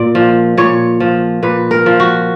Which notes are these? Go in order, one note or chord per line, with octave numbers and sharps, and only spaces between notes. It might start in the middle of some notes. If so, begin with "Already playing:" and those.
Already playing: A#2 D5
F3
A#2 C#5
F3
A#2 B4
A#4
F3
F#4